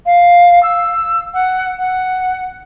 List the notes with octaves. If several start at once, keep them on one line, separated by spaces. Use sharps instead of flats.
F5
E6
F#5
F#5